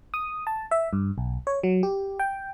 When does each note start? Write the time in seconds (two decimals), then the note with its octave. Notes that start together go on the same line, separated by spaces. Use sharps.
0.14 D#6
0.47 A5
0.71 E5
0.93 G2
1.18 B1
1.47 C#5
1.63 F#3
1.83 G4
2.19 G5